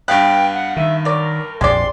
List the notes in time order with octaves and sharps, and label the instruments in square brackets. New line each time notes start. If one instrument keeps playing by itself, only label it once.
[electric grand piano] G2 F5 F#6 [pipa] B3 [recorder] G5
[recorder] F#5
[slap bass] D#3 [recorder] E5
[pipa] F#3 D5 [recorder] A#4
[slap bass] A#1 F2 [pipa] G#3 G4 D5 [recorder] C6